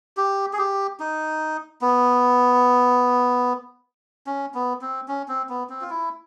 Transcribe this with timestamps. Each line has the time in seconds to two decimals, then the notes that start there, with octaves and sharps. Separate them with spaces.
0.17 G4
0.53 G#4
0.58 G4
1.00 D#4
1.81 B3
4.27 C#4
4.54 B3
4.81 C4
5.08 C#4
5.28 C4
5.49 B3
5.70 C4
5.81 F4
5.90 E4